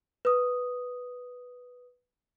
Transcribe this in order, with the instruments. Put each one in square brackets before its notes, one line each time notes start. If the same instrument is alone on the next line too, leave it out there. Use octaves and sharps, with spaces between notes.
[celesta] B4 D#6